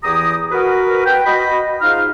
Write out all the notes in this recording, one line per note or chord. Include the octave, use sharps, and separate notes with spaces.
E2 E3 E4 G4 A#5 D#6
F#4 A#4 B4
B4 G5
F#4 D#5 B5
G#2 D#4 F4 F5 F6